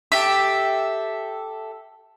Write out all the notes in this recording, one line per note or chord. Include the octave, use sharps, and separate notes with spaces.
G4 A4 E5